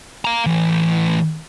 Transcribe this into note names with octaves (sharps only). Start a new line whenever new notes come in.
F5 A#5
A2 E3